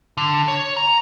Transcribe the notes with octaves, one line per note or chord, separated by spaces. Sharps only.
D3
C#5
A#5